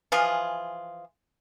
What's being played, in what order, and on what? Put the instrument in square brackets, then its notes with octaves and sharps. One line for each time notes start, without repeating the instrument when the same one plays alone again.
[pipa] E3 F3 F4 G#4